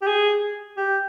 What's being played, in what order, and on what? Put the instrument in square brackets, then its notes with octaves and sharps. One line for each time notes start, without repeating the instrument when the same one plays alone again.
[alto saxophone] G4
G#4
G4